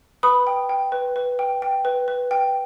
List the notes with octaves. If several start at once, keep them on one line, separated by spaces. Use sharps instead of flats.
B4 B5 D#6
G5
G5
B4
B4
G5
G5
B4
B4
G5